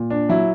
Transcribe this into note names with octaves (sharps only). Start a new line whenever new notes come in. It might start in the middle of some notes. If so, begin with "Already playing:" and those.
Already playing: A#2
D4
F#3 E4